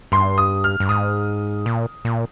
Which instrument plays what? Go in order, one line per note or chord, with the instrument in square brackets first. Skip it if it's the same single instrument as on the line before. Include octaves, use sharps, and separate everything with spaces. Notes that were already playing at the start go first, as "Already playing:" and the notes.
[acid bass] G2 [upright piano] C6
[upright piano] D#6
F6
[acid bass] G2
[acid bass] G#2 [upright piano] D#6
[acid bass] A#2
A#2